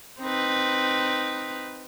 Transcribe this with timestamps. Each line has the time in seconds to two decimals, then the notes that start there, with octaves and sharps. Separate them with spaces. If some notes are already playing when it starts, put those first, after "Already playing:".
0.21 C4 D#4 B4